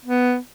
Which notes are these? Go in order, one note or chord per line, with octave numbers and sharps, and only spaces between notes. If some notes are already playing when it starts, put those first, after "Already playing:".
B3